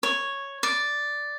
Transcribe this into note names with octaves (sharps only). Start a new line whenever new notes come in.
C#5
D5